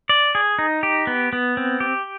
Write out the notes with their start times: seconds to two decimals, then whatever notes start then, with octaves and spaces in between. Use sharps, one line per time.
0.09 D5
0.35 G#4
0.59 D#4
0.83 G4
1.07 B3
1.33 B3
1.57 C4
1.80 G4